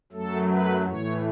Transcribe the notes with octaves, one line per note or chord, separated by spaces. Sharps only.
F#2 F#3 A3 A4
B4
A2 E3 A3 C#5